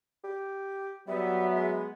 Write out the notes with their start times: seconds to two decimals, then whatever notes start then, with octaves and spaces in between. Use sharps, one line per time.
0.24 G4
1.08 F#3 G3 B3 E5
1.56 G#3